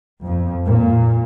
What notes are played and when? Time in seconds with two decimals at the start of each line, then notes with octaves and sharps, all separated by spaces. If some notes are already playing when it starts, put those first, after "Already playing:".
0.23 F2
0.65 A#2